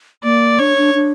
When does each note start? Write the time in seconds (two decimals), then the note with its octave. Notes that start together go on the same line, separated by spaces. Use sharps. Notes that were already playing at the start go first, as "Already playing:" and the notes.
0.24 A#3 D5
0.59 D4 C#5
0.77 D4
0.95 D4